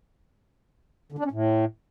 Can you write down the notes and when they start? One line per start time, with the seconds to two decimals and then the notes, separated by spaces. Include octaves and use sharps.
1.12 D3
1.19 D4
1.25 C#4
1.31 A2